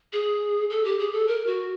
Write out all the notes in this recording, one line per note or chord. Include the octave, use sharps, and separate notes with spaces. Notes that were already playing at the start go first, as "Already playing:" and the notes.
G#4
A4
G4
G#4
A4
A#4
F#4